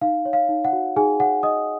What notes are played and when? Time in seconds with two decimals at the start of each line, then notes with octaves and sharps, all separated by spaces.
0.01 D#4 F5
0.25 C#5
0.33 F5
0.49 D#4
0.65 F#5
0.73 F#4
0.96 D#4 G#4 G#5
1.19 C#5 F#5
1.43 D#4 D#5 D#6